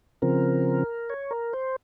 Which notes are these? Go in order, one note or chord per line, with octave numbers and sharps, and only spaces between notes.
C#3 F3 C4 A#4
C#5
A#4
C5